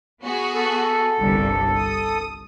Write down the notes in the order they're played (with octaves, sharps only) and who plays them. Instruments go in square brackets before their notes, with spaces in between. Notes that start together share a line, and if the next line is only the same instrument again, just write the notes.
[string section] B3 F#4 G#4
[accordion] A4
[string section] G1 C2 G2
D#6